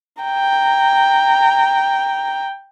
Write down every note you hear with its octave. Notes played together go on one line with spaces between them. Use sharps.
G5 A#5